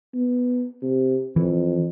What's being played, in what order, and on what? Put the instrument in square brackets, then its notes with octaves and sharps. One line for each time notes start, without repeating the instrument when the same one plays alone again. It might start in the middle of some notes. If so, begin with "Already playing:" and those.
[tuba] B3
C3
[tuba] F2 [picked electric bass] E3